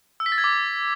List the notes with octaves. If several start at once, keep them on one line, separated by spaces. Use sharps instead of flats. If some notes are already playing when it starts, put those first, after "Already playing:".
E6
B6
A6
G#6
D6